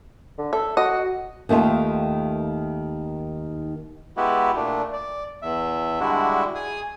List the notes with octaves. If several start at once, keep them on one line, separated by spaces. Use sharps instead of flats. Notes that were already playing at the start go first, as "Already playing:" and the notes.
D3
A4 E5
F#4 D#5
D#2 D#3 A3 F4
G#3 B3 E4 F#4 G4
A#2 A3 D4
D5
E2 E5
D3 G3 G#3 D4 E4 F#4
G#4 G#5 D#6